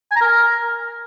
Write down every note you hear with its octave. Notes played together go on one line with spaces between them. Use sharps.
G#5
A#5
A#4